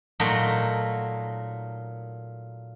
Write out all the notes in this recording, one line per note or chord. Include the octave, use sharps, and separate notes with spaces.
A#2 F#3 A3 D#4